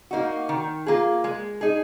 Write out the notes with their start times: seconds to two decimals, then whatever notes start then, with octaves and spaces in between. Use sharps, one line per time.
0.11 A#3 D#4 F#4
0.49 D#3
0.86 A#3 F4 G#4
1.24 G#3
1.61 D#4 G#4